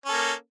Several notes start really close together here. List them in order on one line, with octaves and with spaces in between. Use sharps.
C#4 A4 A#3